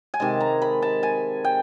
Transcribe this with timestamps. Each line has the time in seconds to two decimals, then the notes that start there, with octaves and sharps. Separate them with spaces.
0.14 G#5
0.20 C3 D#3 G#3 A5
0.40 A#5
0.62 B5
0.82 A5
1.03 G#5
1.44 G5